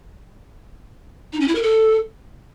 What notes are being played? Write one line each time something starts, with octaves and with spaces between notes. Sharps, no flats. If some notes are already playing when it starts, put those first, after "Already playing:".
D#4
C#4
E4
A#4
A4